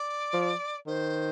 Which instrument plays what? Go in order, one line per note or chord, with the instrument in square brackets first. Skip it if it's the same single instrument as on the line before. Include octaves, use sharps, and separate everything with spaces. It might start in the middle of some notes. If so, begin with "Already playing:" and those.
Already playing: [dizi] D5
[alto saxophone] F3
[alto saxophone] D#3 [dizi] C5